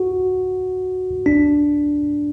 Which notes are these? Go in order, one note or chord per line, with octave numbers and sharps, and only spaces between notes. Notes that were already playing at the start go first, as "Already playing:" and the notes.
Already playing: F#4
D4